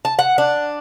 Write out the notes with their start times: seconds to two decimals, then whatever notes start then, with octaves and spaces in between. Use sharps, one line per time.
0.05 A5
0.19 F#5
0.38 D4